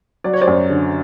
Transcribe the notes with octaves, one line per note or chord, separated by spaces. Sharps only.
F#3 D5
C#5
C5 D5
F#2
D3